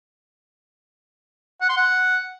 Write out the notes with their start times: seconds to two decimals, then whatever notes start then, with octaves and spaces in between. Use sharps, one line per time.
1.61 F#5
1.69 C6
1.77 F#5